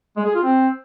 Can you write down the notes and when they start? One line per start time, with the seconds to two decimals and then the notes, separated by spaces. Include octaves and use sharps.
0.16 G#3
0.26 G#4
0.35 F4
0.44 C4